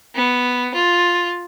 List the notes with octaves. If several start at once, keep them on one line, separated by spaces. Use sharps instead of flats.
B3
F4